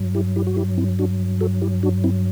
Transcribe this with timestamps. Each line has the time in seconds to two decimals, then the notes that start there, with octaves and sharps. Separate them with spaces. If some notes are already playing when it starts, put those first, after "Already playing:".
Already playing: G2 F#3
0.15 E4 G4
0.36 E4 G4
0.47 F#4
0.57 E4 G4
0.78 C4 E4
0.99 D4 F#4
1.41 F#4 A4
1.62 E4 G4
1.83 D4 F#4
2.04 C4 E4